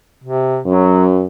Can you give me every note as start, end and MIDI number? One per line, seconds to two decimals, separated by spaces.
0.24 0.59 48
0.66 1.25 42
0.66 1.04 54